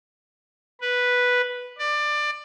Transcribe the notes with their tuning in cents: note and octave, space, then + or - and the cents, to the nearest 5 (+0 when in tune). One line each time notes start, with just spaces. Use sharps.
B4 -5
D5 +20